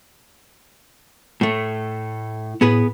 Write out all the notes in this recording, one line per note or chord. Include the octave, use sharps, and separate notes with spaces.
A2 A3
A2 B3 G#4 B4